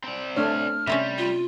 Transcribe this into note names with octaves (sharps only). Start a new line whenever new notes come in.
C4 D5
A3 D4 C#5 F6
C3 G3 C4 C#4
F4